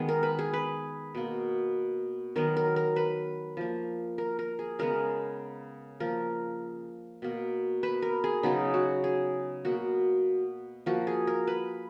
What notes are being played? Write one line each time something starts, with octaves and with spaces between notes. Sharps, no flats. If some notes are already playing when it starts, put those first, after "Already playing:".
Already playing: D#3 G#3 B3
A#4
B4
G#4
B4
B2 A#3
D#3 F#3 B3 A#4
A#4
A#4
B4
F3 A#3
A#4
A#4
G#4
C#3 G#3 B3 A#4
F3 A#3 A#4
B2 A#3
B4
A#4
G#4
C#3 F#3 B3 D#4
F#4
G#4
B2 A#3 F#4
F3 A#3 F#4
G#4
A#4
B4